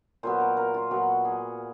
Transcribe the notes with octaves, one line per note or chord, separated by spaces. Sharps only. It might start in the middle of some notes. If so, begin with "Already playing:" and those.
A#2 F#3 B3 C5
A#4
A#4
F4
A#2 F#3 B3 F#4
G#4